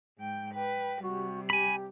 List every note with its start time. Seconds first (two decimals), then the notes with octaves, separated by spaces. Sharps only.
0.18 G#2 G5
0.55 B4 G5
1.02 C3 G3 F#4
1.50 G4 G#5 B5